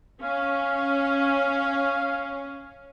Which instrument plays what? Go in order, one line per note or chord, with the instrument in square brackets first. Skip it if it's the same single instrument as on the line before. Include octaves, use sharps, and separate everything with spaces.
[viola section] C#4 [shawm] F5